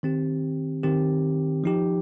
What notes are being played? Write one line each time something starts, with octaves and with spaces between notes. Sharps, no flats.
D#3 C4 G4
D#3 C4 G4
F3 D#4 G4